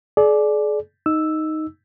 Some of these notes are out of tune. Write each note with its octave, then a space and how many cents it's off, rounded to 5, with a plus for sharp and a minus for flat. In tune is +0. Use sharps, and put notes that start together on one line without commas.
G#4 +40 D5 +0
D#4 +5 E6 +0